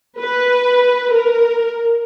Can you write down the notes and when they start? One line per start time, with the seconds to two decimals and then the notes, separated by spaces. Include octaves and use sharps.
0.20 B4
1.13 A#4